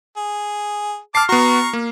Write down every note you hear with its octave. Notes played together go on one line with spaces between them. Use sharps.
G#4
A5 D6 F6 C7
B3 F#4 A#5 C#6
A#3